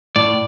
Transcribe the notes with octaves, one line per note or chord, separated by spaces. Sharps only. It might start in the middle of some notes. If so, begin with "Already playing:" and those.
A2 D5